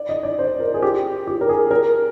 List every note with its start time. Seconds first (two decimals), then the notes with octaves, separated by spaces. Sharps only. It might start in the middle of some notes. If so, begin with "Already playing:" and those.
Already playing: D5
0.09 D#5
0.23 D5
0.39 C5
0.60 A#4
0.74 G#4
0.82 G4
1.27 G4
1.41 A#4
1.49 G#4
1.71 A#4